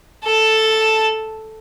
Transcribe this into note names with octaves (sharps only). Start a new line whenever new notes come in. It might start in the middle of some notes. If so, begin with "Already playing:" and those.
A4 A5